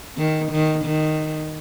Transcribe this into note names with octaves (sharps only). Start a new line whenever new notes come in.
D#3
D#3
D#3